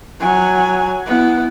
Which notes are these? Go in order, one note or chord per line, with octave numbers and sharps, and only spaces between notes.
F#3 G#5
B3 E4